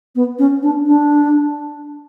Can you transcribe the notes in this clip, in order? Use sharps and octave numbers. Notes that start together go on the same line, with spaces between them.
B3
C#4
D4
D4